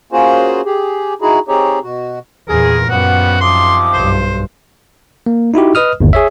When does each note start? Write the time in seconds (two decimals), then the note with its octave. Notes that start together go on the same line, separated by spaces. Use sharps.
0.12 A#3 C#4 F4 F#4 G#4 C5
0.65 G4 G#4
1.22 D#4 E4 F#4 G#4
1.48 C4 D#4 G4 G#4 C#5
1.83 B2 F#4
2.48 E2 A#2 G#4 A#4
2.89 F#2 F3 G3 B3 F#4 F#5
3.41 C3 D#3 F3 C6 D6 D#6
3.93 B1 G2 C5
5.26 A#3
5.54 D#4 E4 F#4 G4
5.75 B4 D#5 D#6 F6
6.00 G1 D#2
6.13 G#4 C#5 E5